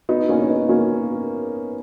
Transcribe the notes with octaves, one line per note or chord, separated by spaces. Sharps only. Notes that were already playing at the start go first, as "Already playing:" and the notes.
B3 D#4
A#3 C#4
C#4
B3 D#4
A#3 C#4